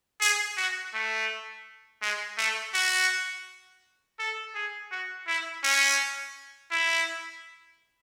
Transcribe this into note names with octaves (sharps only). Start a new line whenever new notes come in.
G#4
F#4
A3
G#3
A3
F#4
A4
G#4
F#4
E4
C#4
E4